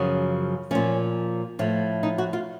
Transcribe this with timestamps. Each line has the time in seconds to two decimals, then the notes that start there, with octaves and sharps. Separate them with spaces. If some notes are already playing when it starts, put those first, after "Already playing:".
Already playing: F#2 C#3 F3
0.71 A#2 F3 C#4
1.59 A2 F3
2.03 D#4
2.18 F#4
2.33 F4